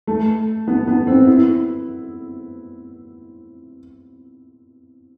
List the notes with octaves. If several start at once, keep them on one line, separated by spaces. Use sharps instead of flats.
A3
B3
B3
C4
E4